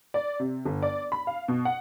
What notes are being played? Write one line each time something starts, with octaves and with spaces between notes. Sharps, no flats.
D5
C3
G1
D5
B5
F5
B2
F#5